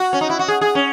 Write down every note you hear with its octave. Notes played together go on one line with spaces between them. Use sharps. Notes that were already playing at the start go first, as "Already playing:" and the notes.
Already playing: F#4
C#4
D#4
E4
F#4
G#4
G#4
C#4